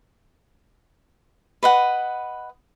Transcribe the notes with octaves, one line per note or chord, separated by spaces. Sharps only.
B4 D#5 F#5